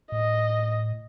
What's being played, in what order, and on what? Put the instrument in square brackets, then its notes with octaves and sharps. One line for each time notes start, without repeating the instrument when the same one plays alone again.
[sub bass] A2 [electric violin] D#5